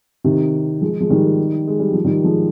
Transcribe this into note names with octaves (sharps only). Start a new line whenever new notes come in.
C3 D#3
F3 G#3
F3 G#3
D#3 G3
G#3
G3
F3
D#3 G3
F3 G#3